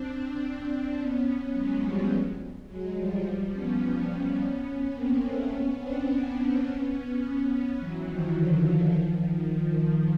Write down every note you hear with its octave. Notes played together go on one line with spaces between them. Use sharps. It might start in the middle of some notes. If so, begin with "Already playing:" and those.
Already playing: C4 D4
B3 C#4
B3 C#4
F#3 G#3
F3 G3
F#3 G#3
F3 G3
F3 G3
B3 C#4
B3 C#4
B3 C#4
A#3 C4
A3 B3
B3 C#4
C4 D4
B3 C#4
E3 F#3
D#3 F3
D3 E3
D3 E3
D#3 F3